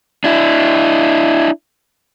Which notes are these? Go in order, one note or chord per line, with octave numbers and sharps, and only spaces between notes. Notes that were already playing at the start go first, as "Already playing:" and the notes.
D4 E4